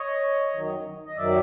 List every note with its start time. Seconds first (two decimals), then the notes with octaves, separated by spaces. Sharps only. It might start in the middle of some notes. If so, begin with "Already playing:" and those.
Already playing: C#5 D#5
0.53 F#2 D#3 F#3
1.06 D#5
1.16 F#2 D#3 F#3 D5 E5